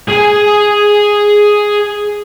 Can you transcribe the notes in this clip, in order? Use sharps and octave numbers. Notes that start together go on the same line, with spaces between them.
G#4 G#5